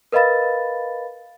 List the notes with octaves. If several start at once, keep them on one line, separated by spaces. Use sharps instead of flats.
A#4 B4 D#5 F5 B5 A6